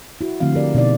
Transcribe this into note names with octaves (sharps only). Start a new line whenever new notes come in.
E4 F#4
D3 F3 A3 C4 F5
G4 A#4 D5
B2 D#4 D5